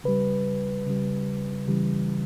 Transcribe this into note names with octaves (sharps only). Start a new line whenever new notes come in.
C#3 G3 B4
C#3 G3
C#3 E3 G3